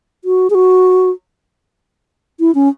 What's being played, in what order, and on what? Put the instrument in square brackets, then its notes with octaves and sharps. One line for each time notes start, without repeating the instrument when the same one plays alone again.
[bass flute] F#4
G#4
F#4
E4
C#4